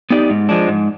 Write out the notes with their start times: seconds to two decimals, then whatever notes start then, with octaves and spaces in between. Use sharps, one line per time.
0.11 B3 D#4 G4 D5
0.30 G#2
0.49 F3 G#3 D4
0.68 G#2